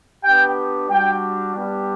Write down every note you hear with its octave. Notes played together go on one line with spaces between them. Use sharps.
B3 D4 G4 G5
G3 D4 F#4 G5
G3 B3 D4 G4